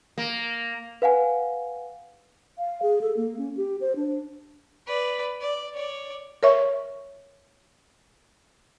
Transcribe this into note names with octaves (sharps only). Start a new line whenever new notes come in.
A#3
B4 F5 F#5 G#5
F5
G#4
A4
A#3
C#4
G4
C5
D4
B4 D5
D5
C#5 D5
A#4 C#5 E5 C#6